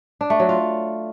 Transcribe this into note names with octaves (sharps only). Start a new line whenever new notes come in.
D4
A3
F#3
F4